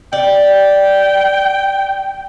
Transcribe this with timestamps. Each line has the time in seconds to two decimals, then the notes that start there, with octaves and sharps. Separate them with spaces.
0.13 D5 G5